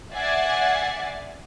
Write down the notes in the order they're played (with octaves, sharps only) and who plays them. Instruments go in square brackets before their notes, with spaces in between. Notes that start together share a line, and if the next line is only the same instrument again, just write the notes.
[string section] D5 E5 F#5 G#5 A6 C7